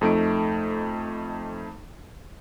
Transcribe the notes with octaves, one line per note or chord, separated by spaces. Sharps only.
F2 A3 D#4 D7